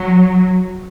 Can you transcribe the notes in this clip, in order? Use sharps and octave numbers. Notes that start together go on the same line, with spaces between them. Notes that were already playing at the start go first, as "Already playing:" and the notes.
Already playing: F#3